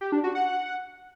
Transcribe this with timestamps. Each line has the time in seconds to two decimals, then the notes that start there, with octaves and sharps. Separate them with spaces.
0.01 G4
0.12 D4
0.24 F#4
0.35 F#5